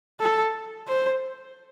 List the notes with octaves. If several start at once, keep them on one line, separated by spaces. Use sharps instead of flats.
A4
C5